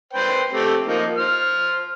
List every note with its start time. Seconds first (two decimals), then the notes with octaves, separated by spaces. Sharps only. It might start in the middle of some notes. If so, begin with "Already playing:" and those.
0.13 B4 C5 G5
0.53 A3 C4 G4
0.87 F3 A#3 D#4
1.17 C5 F6